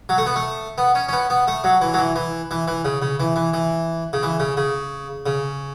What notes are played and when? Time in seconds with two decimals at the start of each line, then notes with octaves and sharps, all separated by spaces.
0.09 F#3
0.18 A3
0.26 B3
0.36 A3
0.78 B3
0.95 C#4
1.09 C#4
1.13 B3
1.30 B3
1.48 A3
1.64 F#3
1.82 E3
1.94 F#3
1.98 E3
2.16 E3
2.51 E3
2.68 E3
2.85 C#3
3.02 C#3
3.20 E3
3.36 E3
3.54 E3
4.13 C#3
4.23 E3
4.40 C#3
4.57 C#3
5.26 C#3